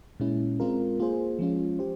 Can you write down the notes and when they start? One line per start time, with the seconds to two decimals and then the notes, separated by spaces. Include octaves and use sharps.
0.20 A#2 G#3 C#4 E4
0.60 G#3 C4 F4 A#4
0.99 A#3 F4 G#4 C5
1.39 F3 G#3 C#4 F4
1.79 G4 C5